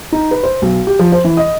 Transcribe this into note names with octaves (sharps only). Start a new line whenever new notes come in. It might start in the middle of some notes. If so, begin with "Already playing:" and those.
D#4
B4
C5
B1
G4
F3
C5
E3
D#5